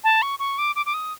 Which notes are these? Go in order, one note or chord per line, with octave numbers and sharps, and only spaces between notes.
A5
C#6
C#6
D6
D6
D6
D#6